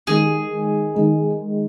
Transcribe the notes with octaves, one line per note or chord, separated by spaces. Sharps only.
D#3 G#3 D#4 G#4
D#3 G#3 D#4